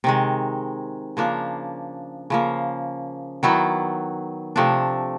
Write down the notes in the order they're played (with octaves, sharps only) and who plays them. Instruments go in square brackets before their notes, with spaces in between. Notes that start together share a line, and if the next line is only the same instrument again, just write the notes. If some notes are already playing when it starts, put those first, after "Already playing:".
[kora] C3 D#3 G#3
C#3 F3 A#3 D4
C#3 F3 A#3
D#3 F#3 B3 E4
C3 F3 A3 D4